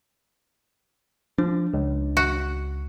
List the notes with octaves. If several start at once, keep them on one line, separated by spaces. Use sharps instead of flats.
F3 D4
C#2
F#4